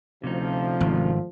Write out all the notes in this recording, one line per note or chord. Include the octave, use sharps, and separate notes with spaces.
D2 C3 F3 C#4 D#4
G#1